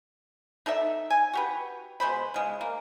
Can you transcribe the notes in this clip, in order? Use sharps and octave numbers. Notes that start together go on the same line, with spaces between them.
D#4 A4 D5 E5
G#5
F#4 G4 B4
B2 G#3 C5 B5
C#3 G#3
A#3